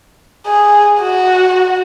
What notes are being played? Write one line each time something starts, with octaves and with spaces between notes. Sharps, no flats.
G#4
F#4